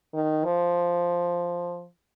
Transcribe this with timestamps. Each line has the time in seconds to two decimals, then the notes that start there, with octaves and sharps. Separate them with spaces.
0.13 D#3
0.44 F3